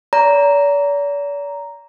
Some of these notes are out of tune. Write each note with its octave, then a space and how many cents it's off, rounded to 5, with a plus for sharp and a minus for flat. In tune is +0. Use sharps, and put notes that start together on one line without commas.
D5 -45 A#5 +0